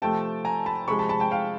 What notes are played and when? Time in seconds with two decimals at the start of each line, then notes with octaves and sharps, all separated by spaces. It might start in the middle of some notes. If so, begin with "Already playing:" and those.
0.02 C3 F3 A3 G5 A5
0.45 G#5 A#5
0.66 A5 B5
0.88 C3 F3 G#3 B5 C#6
0.99 A5 B5
1.09 A5 B5
1.20 G5 A5
1.31 F5 G5